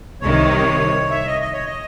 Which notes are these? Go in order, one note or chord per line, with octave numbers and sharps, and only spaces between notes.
C2 C3 D#3 C#5
E5
D#5
D#5
C#5
D#5